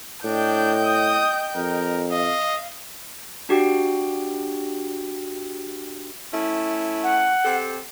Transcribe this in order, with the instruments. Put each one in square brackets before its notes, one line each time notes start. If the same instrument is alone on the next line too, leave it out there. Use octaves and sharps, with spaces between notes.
[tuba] A2 [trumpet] D4 [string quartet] D#5 G5 G6
[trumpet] D#6
[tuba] F2 [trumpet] A#4
[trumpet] D#5 [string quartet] F5
[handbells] D4 F#4 G4 G5
[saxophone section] A3 C#4 E4
[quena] F#5
[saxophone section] C4 G4 A4